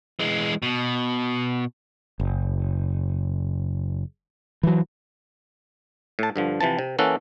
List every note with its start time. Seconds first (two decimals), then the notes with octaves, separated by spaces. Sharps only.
0.19 E3 G#3
0.62 B2
2.20 F#1
4.63 E3 F#3
6.19 A2 A5
6.36 G2 D3 F3
6.61 C3 E3 F3 A5
6.79 C3
6.99 E3 A#3 C#4 A4 F#5